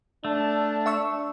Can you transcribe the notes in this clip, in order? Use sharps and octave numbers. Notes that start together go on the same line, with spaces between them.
A3 D4
E5 C#6 E6